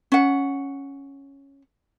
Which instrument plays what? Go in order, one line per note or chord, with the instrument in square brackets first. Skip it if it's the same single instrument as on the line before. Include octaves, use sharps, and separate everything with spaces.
[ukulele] C#4 F#5